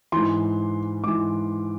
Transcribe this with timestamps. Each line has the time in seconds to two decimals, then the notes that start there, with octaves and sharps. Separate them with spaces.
0.12 G#2 E3 C6
1.04 G#2 E3 D6